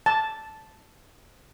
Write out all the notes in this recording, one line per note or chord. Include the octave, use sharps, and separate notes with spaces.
A5